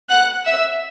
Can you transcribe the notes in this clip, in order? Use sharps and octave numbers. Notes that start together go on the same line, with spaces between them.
F#5 F#6
E5 E6